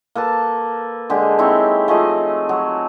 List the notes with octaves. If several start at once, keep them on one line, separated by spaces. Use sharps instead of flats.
A#3 A4 B4 A5
D3 G#3 G4
C4 D#4 E4 C#5
F3 A3 G#4 D#5
F#3